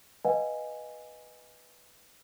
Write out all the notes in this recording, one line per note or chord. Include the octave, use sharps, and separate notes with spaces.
B4 D#5 F5 F#5 G#5